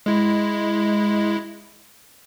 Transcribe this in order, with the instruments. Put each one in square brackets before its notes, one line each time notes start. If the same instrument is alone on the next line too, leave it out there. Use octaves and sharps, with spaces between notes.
[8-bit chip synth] G#3 E4